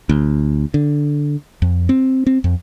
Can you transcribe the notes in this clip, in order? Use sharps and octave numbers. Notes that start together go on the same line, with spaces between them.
D2
D3
F2
C4
C4
F2